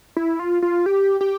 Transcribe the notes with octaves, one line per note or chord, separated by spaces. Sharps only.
E4
F4
F4
G4
G4